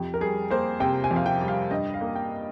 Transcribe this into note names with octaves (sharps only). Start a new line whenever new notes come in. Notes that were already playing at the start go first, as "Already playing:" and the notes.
Already playing: F2 G4
A#4
G3 G#4
A#3 C5
C3 G5
G#5
F2
F5
G5
G3
F5
G2 D#5
F5
A#3
G5